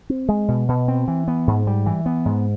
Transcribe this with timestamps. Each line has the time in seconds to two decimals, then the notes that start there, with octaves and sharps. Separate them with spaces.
0.10 C4
0.29 G#3
0.48 B2
0.69 B2
0.88 C4
1.08 E3
1.28 B3
1.47 G#2
1.67 G3
1.86 E3
2.06 B3
2.26 G#2